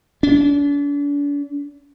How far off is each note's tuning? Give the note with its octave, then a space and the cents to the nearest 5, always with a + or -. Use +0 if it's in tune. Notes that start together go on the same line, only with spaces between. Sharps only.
D4 -40